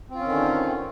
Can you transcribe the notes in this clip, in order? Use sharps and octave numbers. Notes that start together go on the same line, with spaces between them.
D3 D#3 C4 C#4 F4